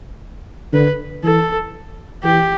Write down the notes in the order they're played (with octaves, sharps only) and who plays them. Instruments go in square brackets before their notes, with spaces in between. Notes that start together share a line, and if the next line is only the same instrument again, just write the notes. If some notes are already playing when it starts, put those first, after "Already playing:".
[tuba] D3 [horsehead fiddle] B4
[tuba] E3 [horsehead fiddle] A4
[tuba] E3 [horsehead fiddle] G4